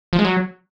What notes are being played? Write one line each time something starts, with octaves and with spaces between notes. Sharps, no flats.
F3
G#3
F#3